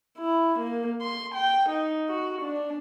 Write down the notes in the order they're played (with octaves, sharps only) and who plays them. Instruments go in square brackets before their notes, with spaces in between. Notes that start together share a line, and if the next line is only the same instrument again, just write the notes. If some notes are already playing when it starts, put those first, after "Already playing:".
[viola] E4
A#3
C6
G5
D#4
F#4
D4